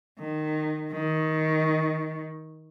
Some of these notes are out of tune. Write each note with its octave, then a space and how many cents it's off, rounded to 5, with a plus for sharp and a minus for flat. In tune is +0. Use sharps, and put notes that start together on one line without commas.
D#3 -15
D#3 +15